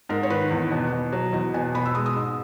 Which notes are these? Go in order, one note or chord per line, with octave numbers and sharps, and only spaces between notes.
G#2 A#4
C#5
D#3 B4
E2
B2
B2
F#3
E2 D#5
B2 G#5
B2 B5
E6
G#3 D#6
D#6
G#2